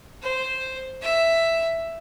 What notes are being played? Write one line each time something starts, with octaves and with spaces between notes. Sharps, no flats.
C5
E5